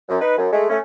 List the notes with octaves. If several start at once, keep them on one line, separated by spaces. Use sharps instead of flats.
F#2
D#4 B4
F#2
G#3 A3
A3 C#4